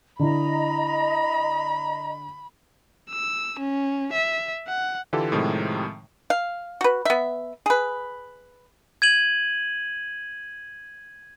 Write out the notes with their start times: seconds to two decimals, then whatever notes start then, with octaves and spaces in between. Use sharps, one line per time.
0.19 D3 E4 D#5 A#5 B5
3.10 E6
3.59 C#4
4.13 E5
4.68 F#5
5.13 D3 E3 F4 G4 A4
5.32 A2 C3 D#3 F3 G#3
6.30 F5
6.81 F#4 B4
7.05 B3 E5
7.66 G#4 B4
9.02 G#6 D#7 F#7